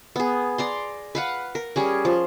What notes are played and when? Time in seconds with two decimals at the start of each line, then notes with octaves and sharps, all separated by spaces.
0.16 B3 G#4
0.58 D5 A#5 C6
1.15 B4 F5 F#5
1.55 A#4
1.76 G3 C#4 G#4
2.05 F3